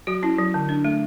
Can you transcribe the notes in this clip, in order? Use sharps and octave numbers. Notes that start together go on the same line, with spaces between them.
F#3 F#4
C#4 E4
F#3
D3
D4
A3